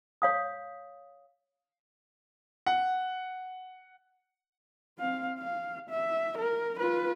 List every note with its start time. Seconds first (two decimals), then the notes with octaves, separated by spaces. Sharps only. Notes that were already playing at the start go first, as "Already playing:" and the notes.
0.22 C#5 F5 D#6
2.66 F#5
4.99 C4 F5
5.39 F5
5.90 E5
6.38 A#4
6.80 F4 B4